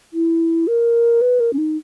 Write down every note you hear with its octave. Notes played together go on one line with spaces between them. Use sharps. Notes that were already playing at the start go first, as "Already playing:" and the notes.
E4
A#4
B4
A#4
C#4
D#4